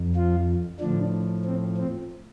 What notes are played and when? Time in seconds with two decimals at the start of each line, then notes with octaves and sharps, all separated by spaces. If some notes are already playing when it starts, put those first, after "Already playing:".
Already playing: F2
0.16 F3 F4
0.80 A2 D3 F3 D4
1.45 C4
1.78 C4